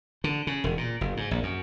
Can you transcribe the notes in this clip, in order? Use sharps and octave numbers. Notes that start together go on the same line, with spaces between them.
D3
C#3
E1
A#2
F#1
G#2
A#1
F#2